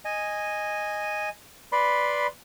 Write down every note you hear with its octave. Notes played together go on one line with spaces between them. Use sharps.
D#5 G#5
B4 D5 B5 C6